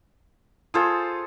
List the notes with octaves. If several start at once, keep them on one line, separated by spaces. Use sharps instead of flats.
F4 G#4 A4 C5